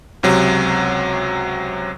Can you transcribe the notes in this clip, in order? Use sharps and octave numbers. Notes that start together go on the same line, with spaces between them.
C#2 C3 F#3